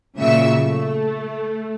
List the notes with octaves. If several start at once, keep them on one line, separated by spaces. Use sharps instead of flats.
A#2 C#3 F#3 E5 C#6 E6
A3